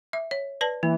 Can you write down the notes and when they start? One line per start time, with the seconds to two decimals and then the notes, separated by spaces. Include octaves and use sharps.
0.13 E5
0.31 C#5
0.61 B4 D5 A5
0.83 E3 A#3